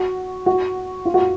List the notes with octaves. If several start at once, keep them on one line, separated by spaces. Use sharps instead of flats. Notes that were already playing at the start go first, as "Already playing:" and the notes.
Already playing: F#4
F#4
F4
F#4